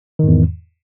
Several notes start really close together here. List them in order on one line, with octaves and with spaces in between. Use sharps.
D#3 G#2 E2